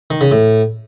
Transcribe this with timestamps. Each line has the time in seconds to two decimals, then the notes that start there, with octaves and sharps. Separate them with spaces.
0.11 D#3
0.21 C#3
0.31 A2